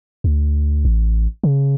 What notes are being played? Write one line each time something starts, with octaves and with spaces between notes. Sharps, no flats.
D2
A1
C#3